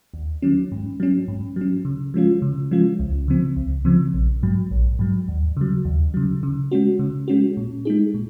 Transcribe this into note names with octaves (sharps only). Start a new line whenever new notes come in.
D#2
D#3 F#3 C#4
G#2
F#3 C#4
G#2
F#3 C#4
C#3
F3 G#3 C#4 F4
C#3
F3 G#3 C#4 F4
C#2
C#3 F3 C4
C#2
C#3 F3 C4
A#1
G#2 F#3
A#1
G#2 F#3
D#2
C#3 F#3
D#2
C#3 F#3
C#3
G#3 C#4 F#4
C#3
G#3 C#4 F#4
A#2
G#3 D#4 G#4
A#2